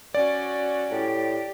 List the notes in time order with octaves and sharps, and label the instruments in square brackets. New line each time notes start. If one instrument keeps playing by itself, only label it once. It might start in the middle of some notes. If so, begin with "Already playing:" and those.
[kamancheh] C#4 F#4 [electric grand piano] D5
[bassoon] A2 [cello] G4